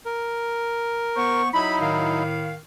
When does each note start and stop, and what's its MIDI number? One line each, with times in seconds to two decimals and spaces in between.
0.06 1.42 70
1.16 1.49 59
1.16 1.49 72
1.16 1.49 85
1.54 2.23 54
1.54 2.23 63
1.54 2.23 64
1.54 1.76 83
1.81 2.56 45
1.81 2.56 51
1.81 2.56 77